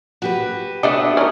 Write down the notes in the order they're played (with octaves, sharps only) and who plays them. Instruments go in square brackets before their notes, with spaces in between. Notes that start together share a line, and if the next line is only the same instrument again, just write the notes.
[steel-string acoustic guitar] F#4 G4 B4
[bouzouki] A3 B3 [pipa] D4 [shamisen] D5 D#5
[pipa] C#4 D#4 A#4 [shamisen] D5